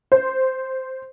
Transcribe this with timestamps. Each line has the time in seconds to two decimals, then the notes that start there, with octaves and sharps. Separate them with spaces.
0.12 C5